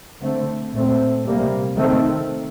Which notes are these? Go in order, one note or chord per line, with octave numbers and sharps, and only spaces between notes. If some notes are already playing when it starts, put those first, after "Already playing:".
D3 A3 C4
A#2 A3 C4
C3 G3 A#3
D#3 A3 C4